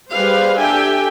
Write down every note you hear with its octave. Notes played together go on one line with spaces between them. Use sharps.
G3 G4 G#4 B4 C5 F5
D4 G4 A4 E5 G5 G#5